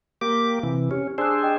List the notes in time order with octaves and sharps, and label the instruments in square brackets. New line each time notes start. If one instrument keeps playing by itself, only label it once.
[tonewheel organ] A#3 G4 D6
C3 E3
[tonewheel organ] C#4 [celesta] G4
[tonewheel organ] D4 G#4 C5 [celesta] E6 F#6
[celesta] D#5 G5